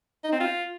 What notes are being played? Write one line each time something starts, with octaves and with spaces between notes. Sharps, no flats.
D#4
C4
F4